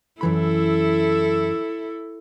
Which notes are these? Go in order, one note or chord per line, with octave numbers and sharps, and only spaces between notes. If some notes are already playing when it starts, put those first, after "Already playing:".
F#2 E3 E4 A4 B5